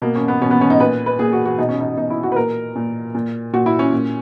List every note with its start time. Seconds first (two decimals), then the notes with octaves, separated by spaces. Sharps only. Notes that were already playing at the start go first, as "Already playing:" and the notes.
0.02 B2 A#3
0.15 C#4
0.28 B3
0.41 B2 C#4
0.51 B3
0.61 C#4
0.70 D#4
0.80 A#2 B4
1.06 B4
1.19 A#2 G#4
1.33 F#4
1.45 F#4
1.58 B2 D#4
1.69 C#4
1.80 D#4
1.97 B2 D#4
2.10 E4
2.23 F#4
2.32 B4
2.36 A#2 A#4
2.75 A#2
3.15 A#2
3.53 A#2 F#4
3.66 E4
3.79 C#4
3.93 A#2